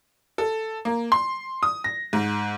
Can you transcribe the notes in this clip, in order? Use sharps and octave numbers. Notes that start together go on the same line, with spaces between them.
A4
A#3
C6
D#6
A#6
G#2